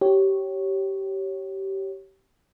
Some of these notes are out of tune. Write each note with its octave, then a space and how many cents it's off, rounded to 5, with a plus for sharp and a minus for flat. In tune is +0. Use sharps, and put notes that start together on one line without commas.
G4 -20 C#5 -5